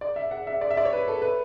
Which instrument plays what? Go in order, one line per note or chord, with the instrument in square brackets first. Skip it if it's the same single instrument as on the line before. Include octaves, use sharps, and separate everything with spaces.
[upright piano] D5
E5
F#5
E5
D5
E5
D5
C#5
B4
A4
B4